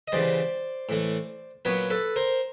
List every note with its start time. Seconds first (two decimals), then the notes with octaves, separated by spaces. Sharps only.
0.08 D#5
0.12 C#3 E3 G3 C5 D5
0.89 A2 E3 A3
1.65 A#2 F#3 B3 B4 C#5
1.90 A4 B4
2.16 A#4 C5